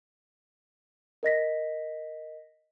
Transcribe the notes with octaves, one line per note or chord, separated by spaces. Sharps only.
A#4 D#5 A#6 B6